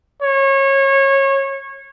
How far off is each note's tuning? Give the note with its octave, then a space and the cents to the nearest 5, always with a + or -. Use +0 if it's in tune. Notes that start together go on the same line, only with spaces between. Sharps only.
C#5 -25